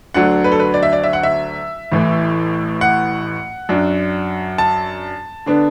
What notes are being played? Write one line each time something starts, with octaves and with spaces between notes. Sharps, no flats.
D2 D3 F#3 D4 F#5
B4
A4
B4
D5
E5
D5
E5
F#5
E5
A1 A2 E3
F#5
F#2 F#3 D4
A5
D3 B3 D4